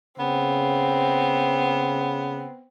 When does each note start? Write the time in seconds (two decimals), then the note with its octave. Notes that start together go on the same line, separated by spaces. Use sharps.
0.19 C#3 B3 C4